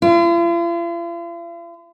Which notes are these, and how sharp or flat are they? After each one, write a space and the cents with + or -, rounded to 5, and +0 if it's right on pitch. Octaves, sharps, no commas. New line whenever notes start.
F4 -45